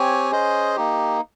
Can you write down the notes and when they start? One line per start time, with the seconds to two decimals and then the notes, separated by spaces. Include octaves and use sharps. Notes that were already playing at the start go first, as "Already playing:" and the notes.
Already playing: C4 G4 C#5 G#5
0.31 C#4 G#4 C5 D#5
0.76 A#3 D#4 G4